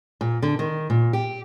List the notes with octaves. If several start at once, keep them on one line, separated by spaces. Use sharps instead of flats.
A#2
D3
D#3
A#2
G4